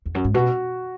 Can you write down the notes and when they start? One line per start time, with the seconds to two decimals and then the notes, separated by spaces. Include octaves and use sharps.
0.06 E2
0.15 F#2
0.24 G#2
0.34 B2 F#4